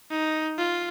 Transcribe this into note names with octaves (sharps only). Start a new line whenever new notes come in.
D#4
F4